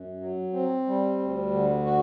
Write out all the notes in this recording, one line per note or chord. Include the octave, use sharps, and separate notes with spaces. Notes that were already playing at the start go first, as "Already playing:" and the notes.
Already playing: F#2
F#3
C4
G3
D2
D3
F#4